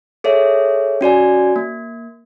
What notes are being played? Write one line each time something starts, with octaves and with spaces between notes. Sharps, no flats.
G#4 A4 C#5 E5
C#4 F#4 D5 G#5
A#3